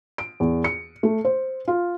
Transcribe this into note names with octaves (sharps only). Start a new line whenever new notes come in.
D7
E2
C#7
A3
C5
F4